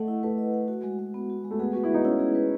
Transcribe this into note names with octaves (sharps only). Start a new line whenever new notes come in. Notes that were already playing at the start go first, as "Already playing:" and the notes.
Already playing: A3 D#5 F#5
E4
A3 B4
D#5
F#5
F#4
G#3
G#3
B3
F#4
G#3
A3
B3 G#4
F#4 B4
E4
B3 D#4
C#4 E4
G#4
B4